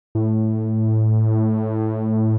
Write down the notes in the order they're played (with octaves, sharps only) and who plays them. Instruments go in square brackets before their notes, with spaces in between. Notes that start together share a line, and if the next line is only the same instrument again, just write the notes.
[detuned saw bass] A2